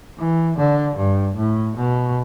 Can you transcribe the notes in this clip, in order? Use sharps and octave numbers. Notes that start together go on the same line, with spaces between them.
E3
D3
G2
A2
B2